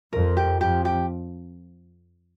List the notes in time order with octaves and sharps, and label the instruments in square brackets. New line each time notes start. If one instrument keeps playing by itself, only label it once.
[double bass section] F2 [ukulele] A#4
[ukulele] G4
[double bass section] F2 [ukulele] G4
[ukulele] G4